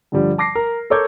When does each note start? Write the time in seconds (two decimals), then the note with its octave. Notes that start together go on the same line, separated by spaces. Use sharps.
0.12 G2 D3 F3 G3
0.38 A5 D6 A#6 C7
0.55 A#4
0.90 A4 A#4 C#5 D6 G6 G#6